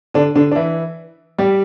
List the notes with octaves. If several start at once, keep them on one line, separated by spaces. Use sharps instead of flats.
D3 D4
D3 D4
D4
E3 E4
G3 G4